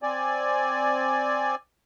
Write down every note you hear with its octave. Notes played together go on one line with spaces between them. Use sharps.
C4 D5 G#5